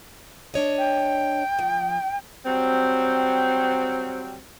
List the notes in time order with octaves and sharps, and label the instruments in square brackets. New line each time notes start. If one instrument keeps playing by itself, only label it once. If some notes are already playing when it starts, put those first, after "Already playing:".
[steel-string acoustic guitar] D4 C#5 D#5
[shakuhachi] G5
[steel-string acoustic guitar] F3
[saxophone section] F#3 G3 C4